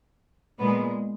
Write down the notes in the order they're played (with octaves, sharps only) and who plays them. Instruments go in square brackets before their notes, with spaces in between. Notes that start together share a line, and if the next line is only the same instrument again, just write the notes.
[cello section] A#2 G#3 B3